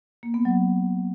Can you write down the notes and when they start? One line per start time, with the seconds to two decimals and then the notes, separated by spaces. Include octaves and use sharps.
0.23 A#3
0.34 B3
0.45 F#3